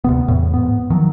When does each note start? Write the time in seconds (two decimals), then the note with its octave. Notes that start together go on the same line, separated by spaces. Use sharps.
0.04 D2 C3 B3
0.28 E2 A2
0.54 G#2 B3
0.90 D#3 F3 F#3